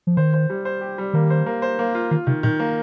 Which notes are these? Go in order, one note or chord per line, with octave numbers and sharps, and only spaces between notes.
F3
D#3 C5
C5
G3
C5
G4
G3
D#3 A#3
C5
A#3
C5
A#3
F4
D#3 F4
C3 D#3
A#2 D#3
A#3